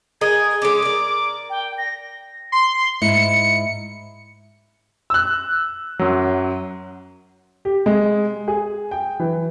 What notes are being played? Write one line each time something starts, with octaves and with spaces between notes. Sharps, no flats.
G#4 A#4 D#5 G#6
G#3 C#4 D6
A#4 D5
G5
A#6
C6
G#2 E4 C#7
E6 F#6
F#2 F#3
G4
G#3
G#4
G5
E3